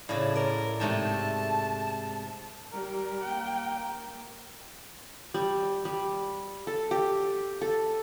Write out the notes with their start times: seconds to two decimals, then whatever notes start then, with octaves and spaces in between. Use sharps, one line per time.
0.09 A2 C#3 D5
0.35 A#4 D5
0.80 G#2 C3 A3 A5
2.73 G3 A#4
3.23 A#3 G5
5.34 G3
5.85 G3
6.67 A4
6.91 G4
7.61 A4